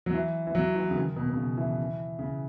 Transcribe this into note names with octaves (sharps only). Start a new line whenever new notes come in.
F#3
E3
E3
F#3
E3
C#3
D#3
B2
B2
C#3
E3
C#3